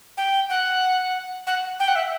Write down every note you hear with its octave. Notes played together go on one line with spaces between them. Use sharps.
G5
F#5
F#5
G5
F#5
E5